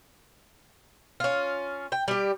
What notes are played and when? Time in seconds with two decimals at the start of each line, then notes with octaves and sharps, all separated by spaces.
1.20 C#4 F4
1.92 G5
2.08 G3 G4